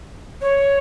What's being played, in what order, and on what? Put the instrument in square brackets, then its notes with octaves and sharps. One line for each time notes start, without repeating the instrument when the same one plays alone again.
[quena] C#5